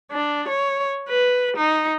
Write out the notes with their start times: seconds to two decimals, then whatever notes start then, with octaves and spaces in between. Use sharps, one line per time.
0.12 D4
0.48 C#5
1.09 B4
1.57 D#4